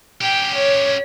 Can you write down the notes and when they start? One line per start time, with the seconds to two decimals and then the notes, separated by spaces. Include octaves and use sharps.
0.21 C#4 G4 G5
0.54 C#5